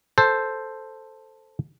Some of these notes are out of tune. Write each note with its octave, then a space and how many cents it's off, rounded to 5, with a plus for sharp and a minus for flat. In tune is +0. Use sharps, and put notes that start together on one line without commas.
A4 +0 C5 +0